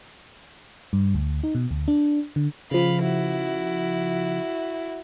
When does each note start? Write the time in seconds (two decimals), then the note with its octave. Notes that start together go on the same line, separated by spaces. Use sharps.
0.93 G2
1.14 D2
1.44 D#4
1.55 B2
1.71 D2
1.88 D4
2.36 D3
2.71 C#3 F3 F5 B5
3.01 E4 F#4